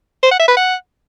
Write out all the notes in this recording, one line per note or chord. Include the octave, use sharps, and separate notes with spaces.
C5
F#5
E5
B4
F#5